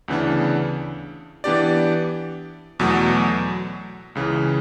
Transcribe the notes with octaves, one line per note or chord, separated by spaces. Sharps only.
D2 C#3 E3 B3 D4
E3 B3 D4 G4 D5
E2 B2 F#3 A3
C#2 C#3 E3